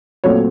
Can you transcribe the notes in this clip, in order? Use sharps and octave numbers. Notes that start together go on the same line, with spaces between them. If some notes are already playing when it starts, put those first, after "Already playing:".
A#2 F#3 A3 C4 C#5